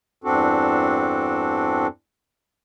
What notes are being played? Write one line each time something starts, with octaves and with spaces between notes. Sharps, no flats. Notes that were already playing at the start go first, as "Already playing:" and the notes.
E2 G2 C4 D4 F#4 A4